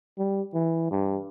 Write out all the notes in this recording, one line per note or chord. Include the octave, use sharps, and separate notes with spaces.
G3
E3
G2